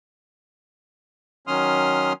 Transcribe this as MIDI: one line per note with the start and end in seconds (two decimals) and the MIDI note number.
1.47 2.13 51
1.47 2.13 54
1.47 2.13 61
1.47 2.13 84
1.47 2.13 87
1.47 2.13 89